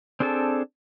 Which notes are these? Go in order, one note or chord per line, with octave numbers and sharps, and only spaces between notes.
C4 D4 G#4 A4 A5